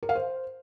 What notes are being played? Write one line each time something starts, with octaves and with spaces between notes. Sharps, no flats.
A#4
F5
C5